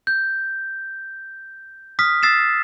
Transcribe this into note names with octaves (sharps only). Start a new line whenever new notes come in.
G6
D#6 F6 B6
D#6 E6 A6 C7 E7